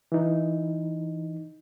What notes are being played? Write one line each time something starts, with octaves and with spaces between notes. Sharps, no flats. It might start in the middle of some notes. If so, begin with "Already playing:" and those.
E3 D#4